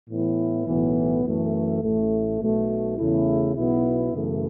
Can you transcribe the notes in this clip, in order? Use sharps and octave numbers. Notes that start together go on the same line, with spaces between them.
A2 E3 B3 E4
B1 A2 E3 B3
F#2 E3 A3
A1 A2 A3
B1 B2 A3
E2 C#3 A3 E4
B1 B2 B3 E4
F#2 C#3 E3 A3